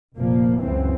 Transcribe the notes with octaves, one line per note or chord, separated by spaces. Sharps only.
F1 A#2 F3 A#3
C#2 F#2 C#3 E3 C4